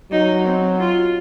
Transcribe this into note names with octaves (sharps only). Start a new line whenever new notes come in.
F#3 D#4
C4
F4